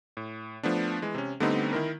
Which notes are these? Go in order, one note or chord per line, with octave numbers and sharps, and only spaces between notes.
A2
F3 A3 B3 D4
E3 G#3
C3 C#4
D3 G3 A3 B3 C4 D#4
D#3 E4 A#4